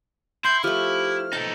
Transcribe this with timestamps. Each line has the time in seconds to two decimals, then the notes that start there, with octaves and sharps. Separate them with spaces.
0.45 E4 C6 G6
0.64 F3 A3 G4 F6
1.33 D#4 A4 A5